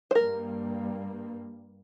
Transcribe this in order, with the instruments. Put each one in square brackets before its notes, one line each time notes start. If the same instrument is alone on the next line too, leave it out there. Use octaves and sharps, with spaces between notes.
[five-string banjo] C5
[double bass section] G2 G3 A#3 [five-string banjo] A#4